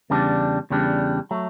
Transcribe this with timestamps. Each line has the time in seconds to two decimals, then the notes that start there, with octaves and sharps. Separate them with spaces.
0.10 E2 C#3 G3 D4
0.70 E2 C#3 G3 D4
1.31 F#3 A3